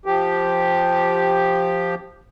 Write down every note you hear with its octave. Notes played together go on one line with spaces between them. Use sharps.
F3 G4